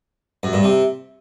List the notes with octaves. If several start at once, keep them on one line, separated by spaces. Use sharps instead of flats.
F#2
G2
C3